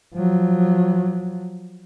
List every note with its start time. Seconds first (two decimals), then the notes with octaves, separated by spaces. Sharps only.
0.15 F3 F#3